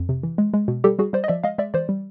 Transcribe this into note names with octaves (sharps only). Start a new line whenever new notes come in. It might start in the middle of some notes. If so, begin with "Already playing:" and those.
Already playing: F2
C3
E3
G#3
G#3
B2
G3 G4 A4
G3 F#4 G#4
G3 C5 D5
D#5
F3 D5 E5
G#3 D#5 F5
G#3 D5 E5
E3 C5 D5
G3